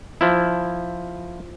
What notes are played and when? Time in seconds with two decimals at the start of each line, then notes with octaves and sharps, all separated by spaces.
0.21 F3 E4